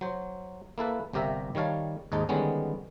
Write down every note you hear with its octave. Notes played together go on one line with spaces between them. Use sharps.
F#3 C5
A#3 E4 A4 B4
G1 C3 G4 A#4 E5
D#3 G3 C#5 F5 A5
D#2 G#2 D#4 A5
D3 D#3 G3 G#3 B3 C#4